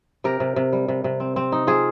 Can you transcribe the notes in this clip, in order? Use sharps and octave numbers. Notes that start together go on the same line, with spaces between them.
C3 G4 A#4
C3
C3
G3
C3
C3
C4
C4
D#4
C4 F4 G#4